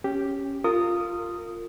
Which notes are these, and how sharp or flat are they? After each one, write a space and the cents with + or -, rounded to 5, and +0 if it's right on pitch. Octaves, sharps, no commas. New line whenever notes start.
C#4 -5 G4 +0
F4 +0 A#4 -30 D#6 +0